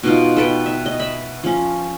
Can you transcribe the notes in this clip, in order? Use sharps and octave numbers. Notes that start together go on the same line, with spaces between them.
B2 D#4 F4
A4 B4 G5
E5
D#5
E5 B5
F3 C#4